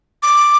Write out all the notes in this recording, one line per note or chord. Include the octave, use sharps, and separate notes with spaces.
D6